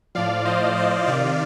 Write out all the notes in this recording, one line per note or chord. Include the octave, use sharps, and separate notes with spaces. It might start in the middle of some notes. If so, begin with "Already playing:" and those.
A2 F3 D5 F5
C5 D#5
C5 D#5
C3 D#3 D5 F5